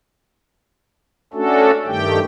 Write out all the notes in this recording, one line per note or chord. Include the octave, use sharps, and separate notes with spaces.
A3 C#4 D4 F#4 A4
G2 D#3 A3 G4 G5